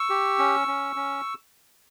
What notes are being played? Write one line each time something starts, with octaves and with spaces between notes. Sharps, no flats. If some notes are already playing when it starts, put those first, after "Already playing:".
Already playing: C#6 E6
G4
C#4
C#4
C#4